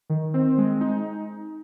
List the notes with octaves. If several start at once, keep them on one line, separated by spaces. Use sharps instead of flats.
D#3
C4
G#3
D#4